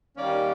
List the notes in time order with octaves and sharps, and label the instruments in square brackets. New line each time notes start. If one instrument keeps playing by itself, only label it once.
[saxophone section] D#2 D#3 G3 A#3 C#4 D5